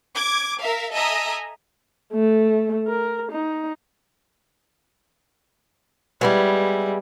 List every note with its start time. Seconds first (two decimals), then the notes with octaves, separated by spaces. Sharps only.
0.15 D6 G#6
0.61 A#4 E5 F5
0.93 A4 D#5 E5 G#5 A#5 D#6
2.13 A3
2.87 A#4
3.31 D#4
6.21 G3 G#3 B3 E4